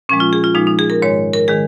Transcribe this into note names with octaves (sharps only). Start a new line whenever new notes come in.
A#2 F3 G#3 C#4
F4
G#4
F4
A#2 F3 G#3 D#4
D#4
G#4
A#4
G#2 D#3 G#3 C#5
A#4
D#3 G#3 G#4